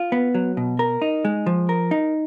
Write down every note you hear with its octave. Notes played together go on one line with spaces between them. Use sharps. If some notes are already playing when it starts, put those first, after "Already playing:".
Already playing: F4
B3
F#3
B2
A#4
D#4
G#3
F3
A#4
D#4